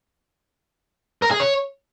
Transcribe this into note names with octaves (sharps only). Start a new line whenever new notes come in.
A#4
G#4
C#5